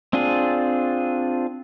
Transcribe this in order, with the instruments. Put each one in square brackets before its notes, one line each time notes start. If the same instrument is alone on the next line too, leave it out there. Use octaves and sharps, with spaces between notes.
[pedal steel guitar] C4 D4 F4 G#4